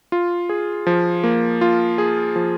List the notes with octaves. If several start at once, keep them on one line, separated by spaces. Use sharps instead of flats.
F4
G#4
F3
A#3
F4
G#4
F3